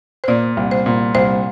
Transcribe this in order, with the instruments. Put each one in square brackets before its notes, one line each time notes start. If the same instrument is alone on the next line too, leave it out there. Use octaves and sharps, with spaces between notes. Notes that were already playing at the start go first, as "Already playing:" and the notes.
[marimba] C5
[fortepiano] A#2 [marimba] D5
[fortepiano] C2
[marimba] C5
[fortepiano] A#2
[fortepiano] C2 [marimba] C5